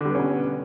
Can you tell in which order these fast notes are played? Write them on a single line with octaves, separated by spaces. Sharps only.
D3 G3 B3 C#4 B2